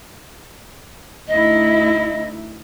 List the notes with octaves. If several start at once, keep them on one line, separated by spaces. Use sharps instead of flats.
D2 D#4 E4 D#5